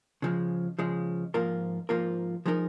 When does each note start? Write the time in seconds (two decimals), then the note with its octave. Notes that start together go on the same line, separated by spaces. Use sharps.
0.22 C#3 F3 G#3
0.79 C#3 F3 G#3
1.34 G#2 F3 A#3 F4 A#4
1.89 G#2 F3 A#3 F4 A#4
2.46 F3 G#3 D#4 A#4